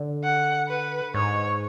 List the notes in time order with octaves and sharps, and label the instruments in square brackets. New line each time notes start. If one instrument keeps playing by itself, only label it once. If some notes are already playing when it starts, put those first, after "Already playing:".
Already playing: [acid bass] D3
[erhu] F#5
B4
[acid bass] G#2 [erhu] C#5